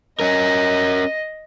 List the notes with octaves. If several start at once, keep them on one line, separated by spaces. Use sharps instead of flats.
C#4 A#4 D#5